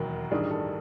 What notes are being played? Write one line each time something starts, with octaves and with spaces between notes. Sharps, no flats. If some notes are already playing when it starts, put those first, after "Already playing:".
Already playing: E1 D#2 D#3 F#3
A1 G2 D#3 G3 G#4
A4